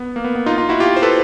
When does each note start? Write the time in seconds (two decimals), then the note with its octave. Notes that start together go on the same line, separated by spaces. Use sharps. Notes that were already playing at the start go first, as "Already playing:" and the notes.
Already playing: B3
0.16 A#3
0.24 B3
0.35 B3
0.46 D#4 F4
0.58 D#4 F4
0.69 E4 F#4
0.80 F4 G4
0.96 C5
1.02 A4 B4